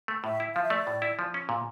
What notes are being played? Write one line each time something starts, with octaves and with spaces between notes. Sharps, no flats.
A3
A2 E5
E4
F3 F5
E5
A3 D5
A2
E4
F3
C#4
A#2